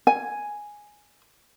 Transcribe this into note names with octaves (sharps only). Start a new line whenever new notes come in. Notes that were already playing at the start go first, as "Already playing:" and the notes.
G#5